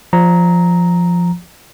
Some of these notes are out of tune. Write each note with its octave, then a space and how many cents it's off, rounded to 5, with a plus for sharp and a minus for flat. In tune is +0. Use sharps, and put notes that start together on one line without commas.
F3 +0 A#5 +0